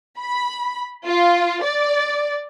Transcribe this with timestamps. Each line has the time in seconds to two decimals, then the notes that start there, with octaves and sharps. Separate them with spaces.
0.19 B5
1.07 F4
1.64 D5